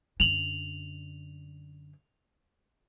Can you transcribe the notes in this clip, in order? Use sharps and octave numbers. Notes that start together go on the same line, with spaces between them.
F#2 D3 F7 F#7